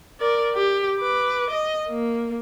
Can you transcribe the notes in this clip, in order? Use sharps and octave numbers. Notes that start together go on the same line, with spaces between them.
A#4 D5
G4
B4 D6
D#5
A#3